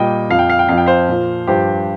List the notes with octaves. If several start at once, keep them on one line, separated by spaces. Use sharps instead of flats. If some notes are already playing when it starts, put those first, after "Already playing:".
Already playing: A#2 G3 D#5 G5
F2 F3 F5
G5
F5
G5
F2 F3 F5
G5
C5 F5
A#2 F3
G2 F3 G4 C5